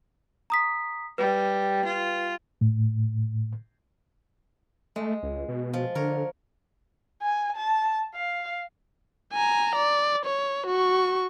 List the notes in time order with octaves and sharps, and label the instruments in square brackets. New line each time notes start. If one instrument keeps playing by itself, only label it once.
[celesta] A#5 D#6 B6
[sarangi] G3 [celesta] B4
[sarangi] F4
[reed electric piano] A2
[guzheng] G#3 [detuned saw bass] A3
[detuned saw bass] C#2
B2
[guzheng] F3
[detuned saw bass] D3 [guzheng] A#4 C#5
[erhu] G#5
A5
F5
[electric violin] G#5 A#5
D5
C#5
F#4 C#6